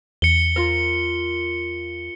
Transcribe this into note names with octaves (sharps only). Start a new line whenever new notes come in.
E2 C#7 G7
F4 A#4